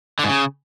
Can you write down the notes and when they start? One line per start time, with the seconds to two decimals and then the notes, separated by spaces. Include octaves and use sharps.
0.19 D3
0.24 G#2
0.29 C#3